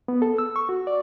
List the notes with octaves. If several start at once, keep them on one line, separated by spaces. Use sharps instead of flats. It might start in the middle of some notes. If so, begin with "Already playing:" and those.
B3
A4
E6
C#6
F#4
D5